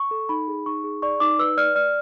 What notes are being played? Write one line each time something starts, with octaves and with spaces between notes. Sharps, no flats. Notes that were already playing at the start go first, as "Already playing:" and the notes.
Already playing: C#6
A4
D#4 B5
G#4
D#4 C#6
G#4
D5 C#6
D#4 D6
B4 E6
D5 F6
D5 F6